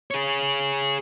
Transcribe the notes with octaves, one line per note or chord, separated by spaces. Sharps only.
G#4 C#5